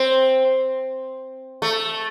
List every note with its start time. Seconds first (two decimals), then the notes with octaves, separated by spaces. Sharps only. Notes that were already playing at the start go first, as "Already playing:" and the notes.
Already playing: C4
1.62 A3